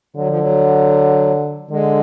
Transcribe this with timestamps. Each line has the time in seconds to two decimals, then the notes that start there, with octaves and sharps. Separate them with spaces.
0.16 D3 F#3
0.28 F3
0.40 F#3
1.70 D3 G#3